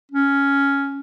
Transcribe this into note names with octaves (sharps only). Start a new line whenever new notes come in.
C#4